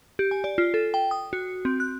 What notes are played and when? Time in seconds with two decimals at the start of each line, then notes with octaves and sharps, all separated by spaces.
0.19 G4
0.31 G#5
0.44 D5
0.58 F4
0.74 A4
0.94 G5
1.11 D#6
1.33 F#4
1.65 C4
1.80 F#6